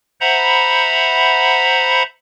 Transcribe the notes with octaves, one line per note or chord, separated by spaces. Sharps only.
C5 E5 F#5 A#5 B5